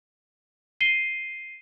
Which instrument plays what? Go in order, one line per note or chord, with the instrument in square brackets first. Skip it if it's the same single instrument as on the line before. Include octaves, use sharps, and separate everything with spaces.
[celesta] C7 D#7 G7